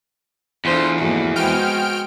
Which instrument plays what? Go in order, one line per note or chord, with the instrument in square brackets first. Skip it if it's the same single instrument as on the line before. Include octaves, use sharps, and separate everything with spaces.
[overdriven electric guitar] E2 [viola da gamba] D4 F4 A4 [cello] C5
[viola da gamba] F2 G#2 A4 [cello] A#3 F#4
[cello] G#3 F#4 [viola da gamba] B3 C5 [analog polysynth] G5 F6 D7